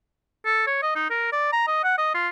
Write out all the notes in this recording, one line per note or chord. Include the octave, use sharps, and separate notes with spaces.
A4
C#5
D#5
D#4
A#4
D5
A#5
D#5
F#5
D#5
F4